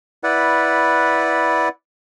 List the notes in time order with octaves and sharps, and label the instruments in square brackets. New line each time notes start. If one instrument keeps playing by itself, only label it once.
[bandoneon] E4 B4 D5 F#5